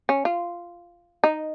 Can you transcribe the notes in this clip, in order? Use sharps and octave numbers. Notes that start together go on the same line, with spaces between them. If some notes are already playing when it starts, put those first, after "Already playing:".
C#4
F4
D#4